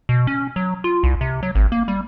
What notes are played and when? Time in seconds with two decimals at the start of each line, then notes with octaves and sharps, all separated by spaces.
0.09 B2
0.27 C#4
0.56 F#3
0.84 F4
1.03 C2
1.21 C3
1.43 F#3
1.55 G#1
1.72 A#3
1.88 G3